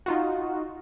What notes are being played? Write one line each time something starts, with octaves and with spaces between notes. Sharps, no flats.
D#4 F4 F#4